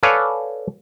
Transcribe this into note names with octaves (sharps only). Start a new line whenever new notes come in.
A4 B4 C#5 D5 F5 G#5